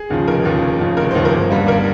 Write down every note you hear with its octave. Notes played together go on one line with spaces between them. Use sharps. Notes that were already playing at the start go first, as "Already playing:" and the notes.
Already playing: G#4
D#2 C#3 F3
F1 A#4
D#2 C#3 F3
F1
D#2 C#3 F3
F1 A#4
D#2 C#3 F3 C5
A#4
G1
G2 G3 A#3
G1 A#4